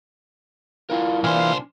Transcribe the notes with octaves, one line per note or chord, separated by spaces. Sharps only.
D4 E4 F4 A#4
C2 A#2 E3 D4 C5 F5 G#5